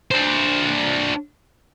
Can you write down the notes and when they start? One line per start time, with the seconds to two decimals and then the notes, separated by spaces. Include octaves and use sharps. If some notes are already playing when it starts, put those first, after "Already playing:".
0.11 D4 C5